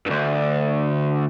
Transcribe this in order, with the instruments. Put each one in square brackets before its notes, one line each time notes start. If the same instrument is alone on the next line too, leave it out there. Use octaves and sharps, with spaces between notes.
[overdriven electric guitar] D2 G2